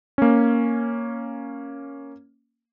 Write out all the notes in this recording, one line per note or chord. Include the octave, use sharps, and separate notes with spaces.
A#3 C#4